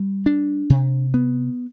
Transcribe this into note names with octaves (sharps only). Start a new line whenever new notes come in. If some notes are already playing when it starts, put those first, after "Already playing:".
Already playing: G3
D4
C3
B3